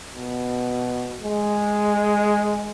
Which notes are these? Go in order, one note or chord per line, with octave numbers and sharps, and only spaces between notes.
B2
G#3